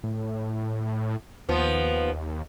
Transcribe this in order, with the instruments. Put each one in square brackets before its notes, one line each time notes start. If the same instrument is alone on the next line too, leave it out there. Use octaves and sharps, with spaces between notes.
[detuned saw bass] A2
[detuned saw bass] D#2 [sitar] F3 B3